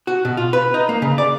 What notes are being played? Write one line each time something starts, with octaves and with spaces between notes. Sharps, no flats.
F#4
B2
F4
B4
D#4
A#3
C#3
D5